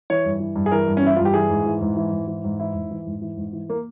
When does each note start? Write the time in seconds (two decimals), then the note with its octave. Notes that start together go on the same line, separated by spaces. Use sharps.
0.10 E3 C#5
0.25 G2
0.40 E3
0.56 G2
0.66 G#4
0.72 E3 A#4
0.87 G2
0.97 C#4
1.02 E3 E4
1.16 G2 F4
1.25 G4
1.34 E3 G#4
1.50 G#2
1.66 E3
1.81 G#2
1.97 E3
2.12 G#2
2.28 E3
2.44 G#2
2.60 E3 E4
2.75 G#2
2.91 E3
3.07 G#2
3.22 E3
3.37 G#2
3.53 E3
3.70 A#3